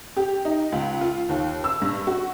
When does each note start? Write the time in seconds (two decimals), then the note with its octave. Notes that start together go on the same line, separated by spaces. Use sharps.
0.17 G4
0.45 D#4
0.72 C#2
1.01 F4
1.29 D#2
1.64 E6
1.82 G2
2.07 F#4